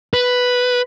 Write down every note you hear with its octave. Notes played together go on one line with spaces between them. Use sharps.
B4